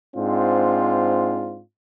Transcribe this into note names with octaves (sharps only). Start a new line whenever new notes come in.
G#2 C4 D4 F4